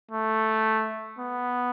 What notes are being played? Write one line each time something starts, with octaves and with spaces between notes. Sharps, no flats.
A3
B3